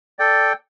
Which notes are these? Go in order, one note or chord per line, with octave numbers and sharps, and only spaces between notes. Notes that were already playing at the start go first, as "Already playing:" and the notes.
A4 D5 G5